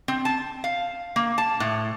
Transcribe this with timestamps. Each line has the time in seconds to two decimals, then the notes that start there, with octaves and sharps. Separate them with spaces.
0.08 C4
0.25 A5
0.64 F5
1.16 A#3
1.38 A5
1.60 A2